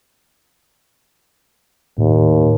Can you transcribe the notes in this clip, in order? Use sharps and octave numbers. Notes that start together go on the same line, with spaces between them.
D#2 A2